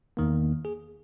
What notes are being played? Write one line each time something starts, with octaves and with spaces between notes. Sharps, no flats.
E2 D#3 A#3
G#4